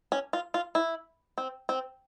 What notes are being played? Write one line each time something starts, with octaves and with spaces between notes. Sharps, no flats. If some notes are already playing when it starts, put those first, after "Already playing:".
C#4
F4
F4
E4
C4
C4